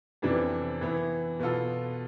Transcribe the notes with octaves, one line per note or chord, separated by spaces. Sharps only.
F2 C3 E3 B3 D4
E3 B3 E4
B2 B3 F4 A4